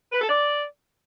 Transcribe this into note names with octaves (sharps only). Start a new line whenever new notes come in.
B4
A4
D5